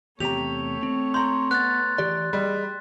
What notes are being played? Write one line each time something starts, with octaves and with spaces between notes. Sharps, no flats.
E2 C3 A3 G4 C#5 A#5 F7
C4
A#5 C6 G6
B3 F#6 A6
E3 G4 D5
G3 G#4 D#5 B5